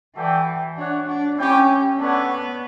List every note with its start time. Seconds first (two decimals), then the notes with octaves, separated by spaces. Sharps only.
0.16 E3 F#4 A4 D5 G5
0.77 D4 F#4 C#5 F#5
1.07 D4
1.37 C#4 E4 G4 C#5 G5
2.00 B3 D4 A4 C#5 F#5